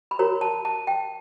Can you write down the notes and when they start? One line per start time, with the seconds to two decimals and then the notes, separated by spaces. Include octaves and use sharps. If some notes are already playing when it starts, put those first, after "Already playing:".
0.11 B5
0.19 F#4 A#4 C#5 A#5
0.41 A5
0.65 A5
0.87 G5